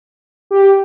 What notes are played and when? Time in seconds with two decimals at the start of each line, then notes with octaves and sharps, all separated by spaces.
0.51 G4